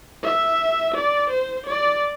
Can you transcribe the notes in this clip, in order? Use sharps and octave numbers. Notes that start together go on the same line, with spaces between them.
E5
D5
C5
D5